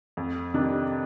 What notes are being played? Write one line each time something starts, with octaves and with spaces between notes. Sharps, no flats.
F2
C3 D#3 G3 D4